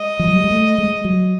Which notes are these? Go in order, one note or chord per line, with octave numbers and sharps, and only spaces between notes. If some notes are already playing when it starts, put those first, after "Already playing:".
Already playing: G#3 D#5
F3
F#3
G3
G#3
A3
G#3
F#3